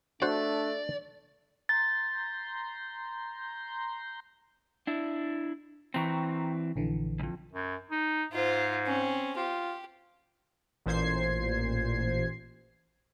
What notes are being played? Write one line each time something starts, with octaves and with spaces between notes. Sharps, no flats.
A3 D4 F#4 C5 D5 F#5
A#5 C6 G6 A6
D4 E4
E3 C4 G5 A#5 C#6
A#1 D3 E3
B1 F2
F#2
D#4
G#2 F4 C5
C4 C#4
F4 G4
A1 A#2 C5 G#6 C7